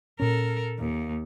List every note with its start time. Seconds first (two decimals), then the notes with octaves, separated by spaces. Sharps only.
0.20 A#2 C#4 A4 A#4
0.79 D#2